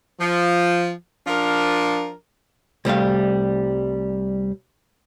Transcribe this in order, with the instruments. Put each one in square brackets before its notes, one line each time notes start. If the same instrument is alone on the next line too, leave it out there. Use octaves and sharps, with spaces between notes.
[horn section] F3
F3 D4 F4 A#4
[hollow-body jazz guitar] C2 G3 A3 F5